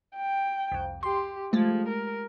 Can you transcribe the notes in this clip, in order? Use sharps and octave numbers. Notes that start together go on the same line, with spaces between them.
G5
C2 F2
G4 C6
F3 G#3 A3
A#4